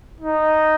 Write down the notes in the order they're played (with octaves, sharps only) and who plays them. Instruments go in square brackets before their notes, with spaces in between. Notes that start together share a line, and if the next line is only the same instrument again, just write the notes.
[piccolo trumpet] D#4